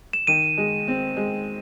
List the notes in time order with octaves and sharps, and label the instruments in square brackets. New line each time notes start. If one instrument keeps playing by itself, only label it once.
[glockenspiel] E7
[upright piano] D#3 [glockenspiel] D#7
[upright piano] G#3
C4
G#3